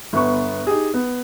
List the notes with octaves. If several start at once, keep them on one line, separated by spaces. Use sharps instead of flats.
G1 B3 C#6
D#4 G4 G#4
B3